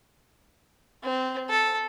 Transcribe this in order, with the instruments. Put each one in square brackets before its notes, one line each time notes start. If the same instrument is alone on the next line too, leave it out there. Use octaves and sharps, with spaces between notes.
[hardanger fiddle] C4
A4